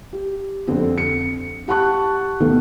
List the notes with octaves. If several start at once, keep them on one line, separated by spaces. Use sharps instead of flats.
G4
F2 D3 C4
C#7
G4 F#5 A5 C#6 F#6
D2 B2 D#3 A3 A#3